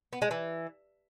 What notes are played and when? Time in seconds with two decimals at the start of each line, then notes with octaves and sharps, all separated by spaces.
0.13 B3
0.22 G#3
0.31 E3